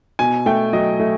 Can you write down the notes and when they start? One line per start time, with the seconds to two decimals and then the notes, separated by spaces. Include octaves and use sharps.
0.19 B2 G#5
0.46 A3 G5
0.73 F#3 D#5
1.00 A3